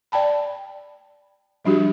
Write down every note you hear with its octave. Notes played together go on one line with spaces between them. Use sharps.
D5 G5 A5 B5
F3 G3 D4 F#4 G4